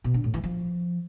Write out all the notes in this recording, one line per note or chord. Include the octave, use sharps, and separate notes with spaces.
B2
D3
A2
E3
F3